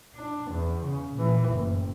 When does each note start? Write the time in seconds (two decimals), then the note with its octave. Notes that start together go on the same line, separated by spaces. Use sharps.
0.15 D4
0.51 E2
0.84 C#3
1.15 A#2 E3
1.49 F#1 A2